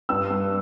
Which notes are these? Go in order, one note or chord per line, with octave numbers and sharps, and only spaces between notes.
G2 E6
G2